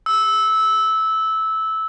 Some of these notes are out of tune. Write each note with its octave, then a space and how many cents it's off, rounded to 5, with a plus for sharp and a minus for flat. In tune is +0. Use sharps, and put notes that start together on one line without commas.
E6 -15